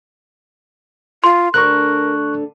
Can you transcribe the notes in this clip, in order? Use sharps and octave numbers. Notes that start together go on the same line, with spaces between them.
F4 C6
D2 D3 D4 A#4 C#6 F#6